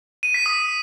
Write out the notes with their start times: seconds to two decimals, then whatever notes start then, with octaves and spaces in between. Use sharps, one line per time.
0.23 D#7
0.34 B6
0.46 D#6